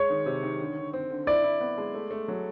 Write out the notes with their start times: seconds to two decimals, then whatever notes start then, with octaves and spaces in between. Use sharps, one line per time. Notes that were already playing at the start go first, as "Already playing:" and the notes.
Already playing: G#3 C#5
0.10 D#3
0.26 C3
0.43 D#3
0.60 D3
0.77 D3
0.93 C4
1.10 D3
1.27 E4 D5
1.44 E4
1.61 B3
1.78 G#3
1.94 A3
2.11 A3
2.28 F#3